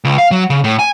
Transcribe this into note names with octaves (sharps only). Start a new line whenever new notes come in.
C#2
F5
F#3
C#3
A2
G#5